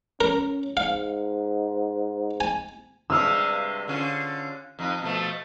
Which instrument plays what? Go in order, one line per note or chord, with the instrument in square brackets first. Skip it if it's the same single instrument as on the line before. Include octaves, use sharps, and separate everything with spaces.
[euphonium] C#4 [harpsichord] A#4
[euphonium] G#2 [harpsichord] F5
[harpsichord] G#5
[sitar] G2 C3 G#3 [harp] E6 F6
[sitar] D3 C#4 F4
F2 D#4
B2 F3 A3